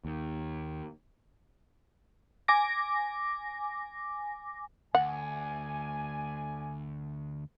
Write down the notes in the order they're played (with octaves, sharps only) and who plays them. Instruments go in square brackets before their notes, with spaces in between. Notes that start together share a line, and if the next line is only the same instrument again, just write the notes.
[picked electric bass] D#2
[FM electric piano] G#5 D6 A#6
[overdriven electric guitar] D2 [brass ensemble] A3 D5 G#5 [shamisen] F#5